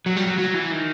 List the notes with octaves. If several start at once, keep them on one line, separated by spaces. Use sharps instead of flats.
F#3
G3
F#3
F#3
E3
D#3